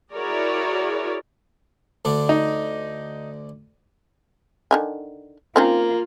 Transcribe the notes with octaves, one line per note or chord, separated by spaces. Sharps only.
E4 F#4 G#4 A#4 C#5 D5
D2 D3 D4
D#4
D3 D#3 G#5
A#3 C4 C#4 D#4 F4